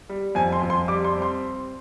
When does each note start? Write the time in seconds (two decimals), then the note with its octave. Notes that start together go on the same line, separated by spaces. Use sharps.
0.09 G3
0.35 F2 G#5
0.52 C6
0.62 F2
0.70 C6
0.88 G3 D6
1.04 C6
1.13 C4
1.22 C6